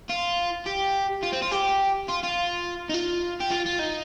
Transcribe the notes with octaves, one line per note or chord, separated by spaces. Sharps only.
F4
G4
F4
C4
F4
G4
F4
F4
D#4
F4
G4
F4
F4
D#4